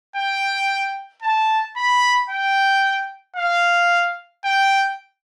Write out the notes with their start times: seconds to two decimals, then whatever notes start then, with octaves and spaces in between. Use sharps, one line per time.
0.16 G5
1.22 A5
1.77 B5
2.30 G5
3.36 F5
4.45 G5